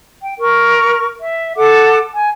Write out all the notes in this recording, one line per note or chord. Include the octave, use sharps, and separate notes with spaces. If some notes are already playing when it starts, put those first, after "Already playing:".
G5
A#4 C#6
E5
A4 F#5 D6
G#5